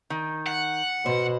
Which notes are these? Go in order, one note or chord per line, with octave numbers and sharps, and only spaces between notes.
D#3
F#5
B2 C5